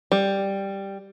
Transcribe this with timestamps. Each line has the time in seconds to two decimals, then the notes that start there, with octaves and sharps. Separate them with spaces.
0.12 G3